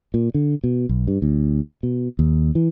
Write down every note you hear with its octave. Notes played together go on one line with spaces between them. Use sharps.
A#2
D3
B2
B1
G2
D2
B2
D#2
E3